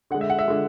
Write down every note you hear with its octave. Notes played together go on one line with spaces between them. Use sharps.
D3 G#3 F#5
E5
F#5
E5
D3 G#3